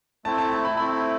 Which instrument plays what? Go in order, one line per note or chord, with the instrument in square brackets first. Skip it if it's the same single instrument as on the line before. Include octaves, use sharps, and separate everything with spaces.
[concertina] A3 C4 E4 [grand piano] A5
[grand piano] A5
A5
B5
[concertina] A3 C4 E4 [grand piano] B5